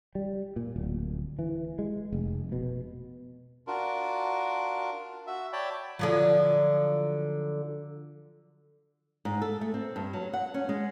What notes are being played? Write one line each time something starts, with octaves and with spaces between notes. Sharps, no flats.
G3
A#2
D1
E3
G#3
F1
B2
D4 F4 F#4 A#4
F#4 E5
C#5 D5 G5 A5 B5
D3 F3 F#3
G#2
A4
A3
C4
G2
F#3
F#5
C#4
G#3